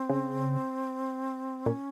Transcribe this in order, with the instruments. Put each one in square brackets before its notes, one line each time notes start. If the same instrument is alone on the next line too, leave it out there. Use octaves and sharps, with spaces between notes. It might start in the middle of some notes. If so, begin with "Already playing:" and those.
Already playing: [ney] C4
[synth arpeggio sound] C#3
[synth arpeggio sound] A#2 [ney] C#4